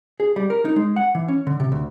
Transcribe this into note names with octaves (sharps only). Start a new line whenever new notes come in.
G#4
G3
A#4
D#4
G#3
F#5
E3
C#4
D3
C3
D2